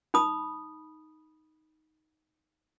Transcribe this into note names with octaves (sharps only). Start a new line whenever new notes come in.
D#4 B5 D#6